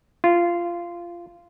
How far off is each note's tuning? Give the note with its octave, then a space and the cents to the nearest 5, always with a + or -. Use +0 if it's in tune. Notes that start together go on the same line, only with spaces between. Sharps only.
F4 -15